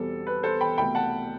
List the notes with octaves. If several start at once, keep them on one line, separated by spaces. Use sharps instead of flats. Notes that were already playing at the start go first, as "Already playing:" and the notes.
Already playing: E2 B2 G3 C4 A4
B4
A4 C5
G5 B5
C2 B2 A3 G5 B5
F#5 A5